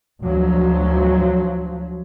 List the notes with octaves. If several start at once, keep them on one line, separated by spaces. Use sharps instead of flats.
D2 F3 F#3